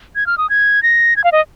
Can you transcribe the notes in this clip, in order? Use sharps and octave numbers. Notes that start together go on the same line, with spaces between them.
G#6
F6
D#6
G#6
A#6
G#6
F5
D#5